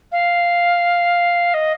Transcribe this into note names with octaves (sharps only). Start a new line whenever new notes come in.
F5
D#5